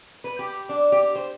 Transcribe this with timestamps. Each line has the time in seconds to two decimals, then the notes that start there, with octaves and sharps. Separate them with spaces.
0.24 B4
0.39 G4
0.69 D4
0.92 G4
1.15 C5